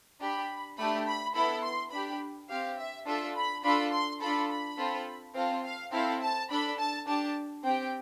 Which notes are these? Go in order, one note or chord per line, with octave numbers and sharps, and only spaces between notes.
D4 G4 B5
A3 D4 G4 B5
B5
B3 E4 A4 B5
C6
D4 G4 B5
C4 G4 F5
E5
D4 F4 A4 E5
B5
D4 F4 A4 B5
C6
D4 F4 A4 B5
B5
C4 F4 A4
C4 F4 A4 F5
F5
C4 E4 A4 F5
A5
D4 A4 B5
A5
D4 G4 A5
C4 G4 G5